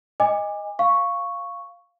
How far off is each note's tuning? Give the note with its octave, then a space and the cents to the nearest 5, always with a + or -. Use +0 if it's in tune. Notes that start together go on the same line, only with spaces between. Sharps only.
D#5 +0 G#5 -30 D6 +15
F5 -5 C#6 +0